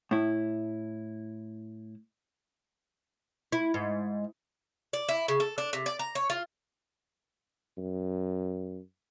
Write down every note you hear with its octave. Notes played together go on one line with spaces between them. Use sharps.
A2 E4
E4
G#2
D5
E4
C#3
A4
D4
C3
D5
A#5
C#5
F4
F#2